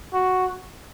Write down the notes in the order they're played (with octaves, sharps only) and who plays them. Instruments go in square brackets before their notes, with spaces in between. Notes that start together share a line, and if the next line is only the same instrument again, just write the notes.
[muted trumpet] F#4